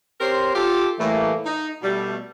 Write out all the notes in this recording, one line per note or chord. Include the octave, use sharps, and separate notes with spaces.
C4 G4 A#4 C#5 C6
F4 G4 A4
A2 E3 G3 A3 A#3
D#4
B2 G3 A3